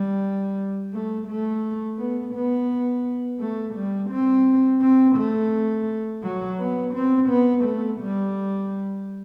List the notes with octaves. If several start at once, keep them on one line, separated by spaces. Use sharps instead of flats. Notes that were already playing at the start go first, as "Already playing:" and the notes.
Already playing: G3
A3
A3
B3
B3
A3
G3
C4
C4
A3
F#3
B3
C4
B3
A3
G3